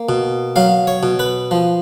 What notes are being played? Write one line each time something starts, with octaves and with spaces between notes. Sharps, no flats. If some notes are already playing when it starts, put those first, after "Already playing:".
Already playing: A#3
B2
F#3 F5
C#5
B2
B4
F3